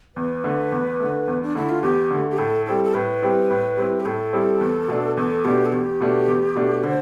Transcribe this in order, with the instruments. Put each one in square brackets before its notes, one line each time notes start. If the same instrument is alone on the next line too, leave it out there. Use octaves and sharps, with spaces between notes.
[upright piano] E2 [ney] B4
[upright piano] D3 A3
E2
D3 A3
E2
[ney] D4
[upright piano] D3 A3 [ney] E4
[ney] F4
[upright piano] E2 [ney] G4
[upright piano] D3 A3
[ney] G4
[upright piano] A2 [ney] A4
[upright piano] G3 C4 E4 [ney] A4
[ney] A4
[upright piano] A2 [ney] B4
[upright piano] G3 C4 E4
A2
G3 C4 E4
[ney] G4
[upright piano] A2 [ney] A4
[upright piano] G3 C4 E4
E2
B2 A3 D4
[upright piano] E2 [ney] A4
[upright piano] B2 A3 D4 [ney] G4
[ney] A4
[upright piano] E2 [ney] G4
[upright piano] B2 A3 D4
E2
B2 A3 D4
[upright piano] D3 [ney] C5